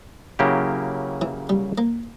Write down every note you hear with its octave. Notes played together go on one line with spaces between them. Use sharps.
C#3 F#3 A#3 E4 G4
E3
G3
A#3